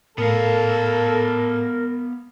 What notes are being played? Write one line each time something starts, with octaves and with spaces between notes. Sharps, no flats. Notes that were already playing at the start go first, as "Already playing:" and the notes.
A2 B3 A4 A#4 F5